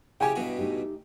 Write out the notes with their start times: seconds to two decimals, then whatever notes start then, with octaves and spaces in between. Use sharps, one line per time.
0.20 C#3 C#4 E4 G4 G5 G#5
0.35 G2 B2 F#4
0.59 A3 D#4 G4